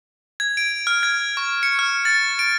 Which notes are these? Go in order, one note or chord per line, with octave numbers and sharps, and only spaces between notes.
G#6
D7
F6
G#6
C#6
C#7
F6
A6
D7